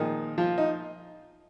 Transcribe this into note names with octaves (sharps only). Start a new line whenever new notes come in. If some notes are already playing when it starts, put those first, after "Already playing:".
Already playing: A#2 D#3 F3 G#3 D#4
F3 F4
D#4